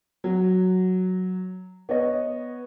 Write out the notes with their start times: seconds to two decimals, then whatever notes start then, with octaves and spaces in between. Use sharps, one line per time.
0.24 F#3
1.89 B3 C#5 D#5